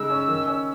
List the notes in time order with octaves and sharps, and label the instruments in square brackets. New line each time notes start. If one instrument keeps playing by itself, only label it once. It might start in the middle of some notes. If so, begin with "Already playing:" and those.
Already playing: [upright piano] C#3 G#3 D#4 [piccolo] E6
[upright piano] C#4
D#3
C#4